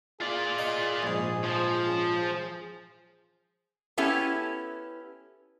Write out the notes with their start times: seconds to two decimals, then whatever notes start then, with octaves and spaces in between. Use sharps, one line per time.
0.21 F4 G#4 D5
0.59 D#5
1.03 A#1 G#2
1.44 F3
1.88 C#4
2.22 G#4
3.98 B3 C#4 E4 G4 A4